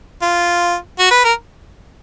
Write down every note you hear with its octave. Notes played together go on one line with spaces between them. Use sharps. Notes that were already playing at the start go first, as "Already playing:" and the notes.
F4
F#4
B4
A#4